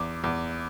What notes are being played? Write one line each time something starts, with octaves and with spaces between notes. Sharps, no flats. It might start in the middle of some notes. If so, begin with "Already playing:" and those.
Already playing: E2 D6
E2